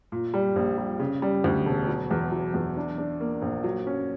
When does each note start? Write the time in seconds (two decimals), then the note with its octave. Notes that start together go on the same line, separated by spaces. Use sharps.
0.12 A#2
0.34 G3
0.56 A#1
0.78 G3
1.00 C#3
1.22 G3
1.44 D2
1.66 E1
1.88 F#3
2.11 E2
2.32 F#3
2.54 E2
2.77 D4
2.98 D4
3.21 A#3
3.42 A#1
3.64 F#3
3.87 C#4